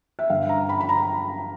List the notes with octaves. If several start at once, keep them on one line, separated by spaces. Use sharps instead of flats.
E5
G2 D3 F5
A#5
B5
B5
A#5